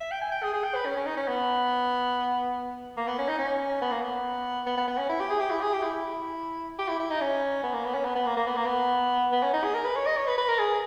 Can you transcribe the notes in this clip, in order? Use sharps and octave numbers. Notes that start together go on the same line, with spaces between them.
E5
G5
G#5
G5
G#4
G#4
G5
B4
C#4
C#4
D#4
C#4
B3
A#3
B3
C#4
D#4
C#4
B3
A#3
B3
B3
B3
B3
C#4
E4
G4
G#4
G4
E4
G#4
G4
E4
E4
G4
E4
E4
D#4
C#4
B3
A#3
B3
C#4
B3
B3
A#3
A#3
B3
A#3
B3
B3
C#4
D#4
G#4
A#4
B4
C#5
D#5
C#5
B4
B4
A#4
G#4